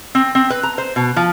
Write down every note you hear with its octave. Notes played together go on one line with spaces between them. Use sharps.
C4
C4
B4
A#5
C5
B2
F3